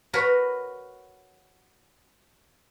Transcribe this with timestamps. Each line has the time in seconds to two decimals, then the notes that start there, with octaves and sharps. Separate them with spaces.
0.13 F#4 A#4 B4 C#5